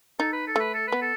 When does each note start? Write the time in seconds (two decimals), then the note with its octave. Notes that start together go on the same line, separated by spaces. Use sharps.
0.20 D#4 A4
0.33 B4
0.47 A4
0.56 A3 B4
0.74 A4
0.88 B3 B4
1.02 A4